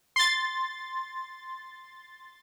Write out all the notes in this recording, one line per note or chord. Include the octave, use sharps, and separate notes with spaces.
C6 A6